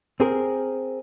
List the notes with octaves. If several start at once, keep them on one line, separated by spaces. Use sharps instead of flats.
C4 G#4 A#4